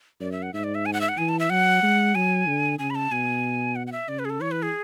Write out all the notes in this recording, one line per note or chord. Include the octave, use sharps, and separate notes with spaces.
F#2 D5
E5
F#5
G#2 E5
D5
E5
G#5
F#5
E5
F#5
E3 G#5
A5
E5
F#3 F#5
G#3
F#3 G#5
D3
C#3 G#5
B5
A5
B2 G#5
F#5
F#5
E5
C#3 D5
B4
G#4
A4
E3 C#5
B4
G#4